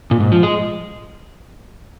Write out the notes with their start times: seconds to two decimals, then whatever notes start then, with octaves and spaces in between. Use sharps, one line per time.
0.11 A#2
0.20 G#2
0.32 F3
0.43 G#3